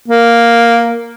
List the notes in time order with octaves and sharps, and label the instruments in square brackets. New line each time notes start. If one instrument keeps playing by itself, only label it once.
[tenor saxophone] A#3